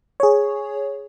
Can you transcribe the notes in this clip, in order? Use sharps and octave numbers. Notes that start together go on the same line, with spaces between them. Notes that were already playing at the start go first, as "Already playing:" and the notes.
G#4 C#5